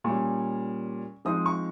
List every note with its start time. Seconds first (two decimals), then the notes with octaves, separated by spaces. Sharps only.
0.04 A#2 G3 C#4 C#6
1.25 F3 G#3 C4 D#4 D#6
1.46 C#6